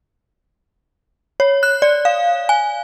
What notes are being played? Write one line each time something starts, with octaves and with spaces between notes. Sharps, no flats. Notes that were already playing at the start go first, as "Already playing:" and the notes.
C#5
F#6
D5
F5
G#5